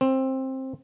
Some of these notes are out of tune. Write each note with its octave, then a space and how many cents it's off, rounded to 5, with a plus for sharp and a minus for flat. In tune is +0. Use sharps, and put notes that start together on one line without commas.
C4 +15